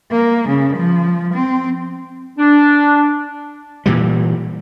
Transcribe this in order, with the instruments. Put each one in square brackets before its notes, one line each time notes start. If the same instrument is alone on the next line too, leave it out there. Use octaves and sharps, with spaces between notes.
[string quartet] A#3
C#3
F3
C4
[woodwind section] D4
[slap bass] A#2 E3 G3